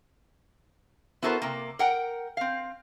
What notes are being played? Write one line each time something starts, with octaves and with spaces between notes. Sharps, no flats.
B3 E4 F#4 A4 A#4 C5
C3 A#3
A#4 F#5 G5
C4 F5